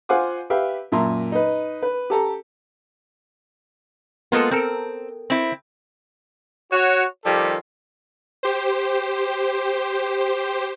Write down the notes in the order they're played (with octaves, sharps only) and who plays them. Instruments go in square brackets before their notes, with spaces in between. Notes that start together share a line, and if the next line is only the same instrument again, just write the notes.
[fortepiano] F4 C5 F5 F#5 G#5 D6
G4 B4 E5 F5 G5
F#2 A#2 E5 A5 A#5 C6
D#4 B4
B4
G4 A4 A#5
[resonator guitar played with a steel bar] G#3 B3 F4 [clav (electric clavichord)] A#3 A4
[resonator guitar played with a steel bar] C4 [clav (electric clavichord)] A4 A#4 G5
[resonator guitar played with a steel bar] C4 E4
[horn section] F#4 C#5
D#3 F3 G3 F4 G4 A4
[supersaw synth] G4 C5